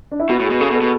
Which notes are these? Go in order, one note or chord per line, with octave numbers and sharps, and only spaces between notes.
D4
E4
B2 F#4
A2
G#4
B2
C#3 A4
B2
A4
B2